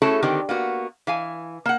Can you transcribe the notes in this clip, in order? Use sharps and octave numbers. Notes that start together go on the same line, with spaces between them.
A3 C#4 E4 F#4 G#4 A4
D3 D#3 C4 G4
A#3 B3 F#4
E3 F5 G#5
A#3 F#5